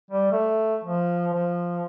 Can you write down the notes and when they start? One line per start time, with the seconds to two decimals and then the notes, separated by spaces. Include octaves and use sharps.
0.11 G3
0.32 A3
0.84 F3
1.34 F3